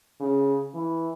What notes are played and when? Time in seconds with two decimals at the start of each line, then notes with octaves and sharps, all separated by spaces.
0.20 C#3
0.74 E3